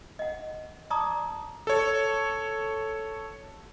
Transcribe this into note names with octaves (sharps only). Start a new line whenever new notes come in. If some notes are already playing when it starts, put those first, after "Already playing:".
D#5 F#5
D5 A5 A#5 C6 D6 D#6
A4 C#5